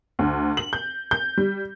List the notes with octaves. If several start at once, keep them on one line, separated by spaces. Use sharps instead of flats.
D2
F#7
G6
G6
G3